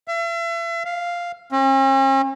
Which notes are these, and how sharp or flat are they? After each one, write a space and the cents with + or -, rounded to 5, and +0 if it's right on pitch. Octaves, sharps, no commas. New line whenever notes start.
E5 +40
F5 +0
C#4 -45